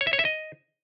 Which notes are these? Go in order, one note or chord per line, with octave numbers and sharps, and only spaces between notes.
C#5
E5
C#5
E5
D#5